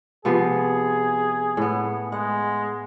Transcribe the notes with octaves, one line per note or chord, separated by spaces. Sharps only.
C3 F3 B3 G#4
A2 B3
G#3 F#5